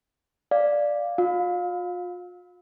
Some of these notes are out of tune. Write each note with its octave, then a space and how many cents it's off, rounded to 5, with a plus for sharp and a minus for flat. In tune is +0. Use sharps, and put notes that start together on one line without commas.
D5 +0 F5 +0
F4 +40 F5 +20 E6 -35